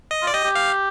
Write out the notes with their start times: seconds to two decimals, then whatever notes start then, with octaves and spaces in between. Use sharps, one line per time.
0.11 D#5
0.22 F4
0.27 D5
0.33 G4 D#5
0.44 G4
0.55 F5